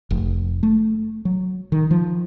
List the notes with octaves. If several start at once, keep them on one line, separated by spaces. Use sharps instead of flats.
F1
A3
F#3
D#3
F3